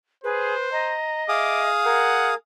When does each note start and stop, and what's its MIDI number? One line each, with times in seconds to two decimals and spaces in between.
0.24 0.54 68
0.24 0.70 71
0.24 0.97 72
0.72 1.69 75
0.72 1.24 82
1.29 2.34 68
1.29 1.70 76
1.29 2.34 77
1.29 1.65 86
1.29 2.34 87
1.85 2.36 70
1.85 2.31 78
1.85 2.35 92